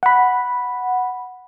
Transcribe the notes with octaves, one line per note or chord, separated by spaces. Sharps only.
F#5 B5